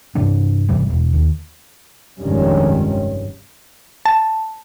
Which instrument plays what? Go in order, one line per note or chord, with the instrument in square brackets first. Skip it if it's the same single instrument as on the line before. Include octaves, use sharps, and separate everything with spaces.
[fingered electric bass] G2 C3 E3 D4
G1 C3 E3 G3
E1
D#2
[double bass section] F1 A#1 G2 D#3 G#3 C#4
[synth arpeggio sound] A5